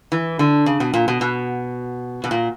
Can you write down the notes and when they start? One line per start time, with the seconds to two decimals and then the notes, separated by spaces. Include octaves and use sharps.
0.12 E3
0.39 D3
0.66 C#3
0.80 B2
0.94 A#2
1.08 B2
1.21 B2
2.24 B2
2.31 A#2